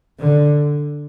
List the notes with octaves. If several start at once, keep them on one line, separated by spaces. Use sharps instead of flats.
D3